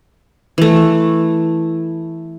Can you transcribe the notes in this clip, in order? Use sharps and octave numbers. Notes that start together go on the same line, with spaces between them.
E3 A3